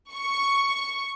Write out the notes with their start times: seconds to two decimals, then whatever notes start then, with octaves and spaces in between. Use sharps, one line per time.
0.12 C#6